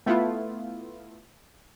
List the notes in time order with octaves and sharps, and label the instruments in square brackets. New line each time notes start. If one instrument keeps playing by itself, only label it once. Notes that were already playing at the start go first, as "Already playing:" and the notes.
[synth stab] A3 B3 E4 F4